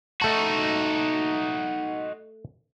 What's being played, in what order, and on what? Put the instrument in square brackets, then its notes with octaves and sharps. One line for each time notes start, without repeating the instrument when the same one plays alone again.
[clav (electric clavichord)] A3 A5 [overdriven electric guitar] D#4 F#4